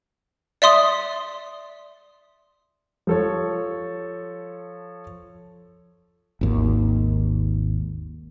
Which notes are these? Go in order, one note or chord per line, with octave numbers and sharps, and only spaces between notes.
D5 E5 C6 D#6
F3 A4 C#5
G#1 D#2